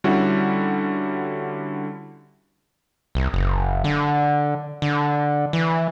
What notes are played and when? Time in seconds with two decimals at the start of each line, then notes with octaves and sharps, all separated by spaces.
0.04 D3 G3 C#4 E4 F#4
3.15 C2
3.34 F#1
3.84 D3
4.82 D3
5.53 E3